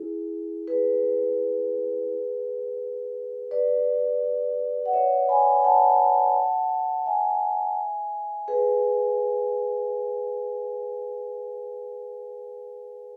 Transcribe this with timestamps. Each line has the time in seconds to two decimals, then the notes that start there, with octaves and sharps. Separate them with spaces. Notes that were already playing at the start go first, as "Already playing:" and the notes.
Already playing: E4 G#4
0.67 G#4 B4
3.51 B4 D5
4.86 F#5
4.93 C#5 E5
5.28 G#5 B5
5.64 F#5 A5
7.06 E5 G#5
8.48 G#4 B4